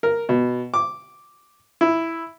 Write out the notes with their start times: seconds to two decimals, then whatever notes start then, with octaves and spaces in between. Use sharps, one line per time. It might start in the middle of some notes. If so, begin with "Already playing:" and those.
0.03 A#4
0.29 B2
0.74 D6
1.81 E4